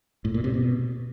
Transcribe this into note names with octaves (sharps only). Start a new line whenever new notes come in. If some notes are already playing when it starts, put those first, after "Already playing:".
A2
A#2
C3
B2